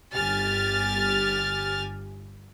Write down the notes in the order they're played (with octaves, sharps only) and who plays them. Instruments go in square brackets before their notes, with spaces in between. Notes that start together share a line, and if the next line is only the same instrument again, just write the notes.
[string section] G1 G4 G#5 F6 A6